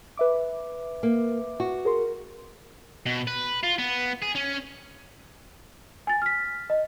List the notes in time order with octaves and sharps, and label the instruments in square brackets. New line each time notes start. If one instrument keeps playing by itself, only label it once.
[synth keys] B4 E5 D6
[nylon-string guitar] A#3
F#4
[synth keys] G#4 A#4 C6
[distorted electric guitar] B2
B4
F4
B3
G#4
C#4
[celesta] G#5 A6
F6 B6
D#5